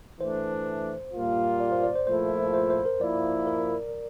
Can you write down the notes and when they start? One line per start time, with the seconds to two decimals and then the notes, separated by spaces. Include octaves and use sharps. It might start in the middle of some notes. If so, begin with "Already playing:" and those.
0.20 E3 A3 D4 C5
1.13 A#2 G3 A#3 F4
1.60 D5
1.72 C5
1.83 D5
1.95 C5
2.07 A#2 F3 A3 E4 C5
2.54 C5
2.70 C5
2.85 A#4
3.01 F3 A#3 E4 D5
3.47 A#4